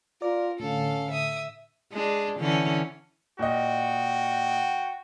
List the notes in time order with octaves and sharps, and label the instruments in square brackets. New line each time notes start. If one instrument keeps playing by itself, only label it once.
[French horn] F4 [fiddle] A#4 [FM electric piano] D5
[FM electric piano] A2 D3 [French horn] C#4 [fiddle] A4 F5
[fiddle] E5 D#6
[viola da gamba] G#3 D4
D3 E3 C#4
[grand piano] A#2 D#5 [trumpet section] F#4 G5